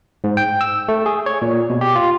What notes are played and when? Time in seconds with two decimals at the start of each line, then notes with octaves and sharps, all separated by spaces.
0.24 G#2
0.37 G5
0.61 E6
0.88 A3
1.06 G#4
1.26 C#5
1.42 A#2
1.70 B2
1.81 G4
1.96 F4